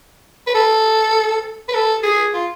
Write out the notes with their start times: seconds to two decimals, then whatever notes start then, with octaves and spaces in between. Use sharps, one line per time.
0.47 B4
0.54 A4
1.68 B4
1.74 A4
2.03 G#4
2.34 F4